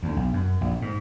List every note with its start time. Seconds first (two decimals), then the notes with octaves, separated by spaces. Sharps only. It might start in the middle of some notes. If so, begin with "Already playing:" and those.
0.03 D2
0.17 B1
0.33 F#2
0.61 A#1
0.82 G#2